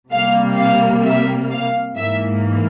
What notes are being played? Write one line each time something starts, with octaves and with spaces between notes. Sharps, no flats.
C3 G3 A#3 F5
F5
E5
F5
G#2 E3 A#3 E5